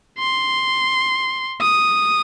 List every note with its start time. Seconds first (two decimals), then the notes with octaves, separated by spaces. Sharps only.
0.19 C6
1.61 D#6